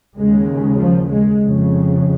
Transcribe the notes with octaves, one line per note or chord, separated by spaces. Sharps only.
D#2 C#3 G#3
F3
G#3
F2 C#3